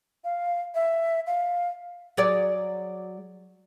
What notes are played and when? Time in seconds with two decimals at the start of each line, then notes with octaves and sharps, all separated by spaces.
0.24 F5
0.75 E5
1.27 F5
2.17 F#3 G#4 D5